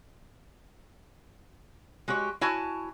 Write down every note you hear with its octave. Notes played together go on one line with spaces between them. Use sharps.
G#3 F#4 G4 C#5
E4 F#4 C#5 G#5 A5